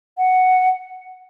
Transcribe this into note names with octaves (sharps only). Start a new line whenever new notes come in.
F#5